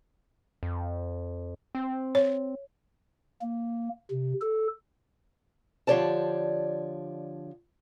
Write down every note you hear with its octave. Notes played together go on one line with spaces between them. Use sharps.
F2
C4
C#5
A#3
C3
A4
D3 F3 G4 C#5 D5 A5